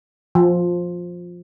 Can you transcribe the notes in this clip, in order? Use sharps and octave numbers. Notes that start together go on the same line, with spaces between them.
F3